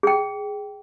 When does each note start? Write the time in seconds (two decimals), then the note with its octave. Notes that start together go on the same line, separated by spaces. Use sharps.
0.03 G#4 G5